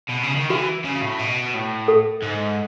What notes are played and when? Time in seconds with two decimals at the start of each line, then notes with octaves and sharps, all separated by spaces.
0.09 B2
0.23 C#3
0.36 D#3
0.50 E3 F#4
0.85 C#3
1.02 A2
1.19 B2
1.54 A2
1.88 A4
2.23 G#2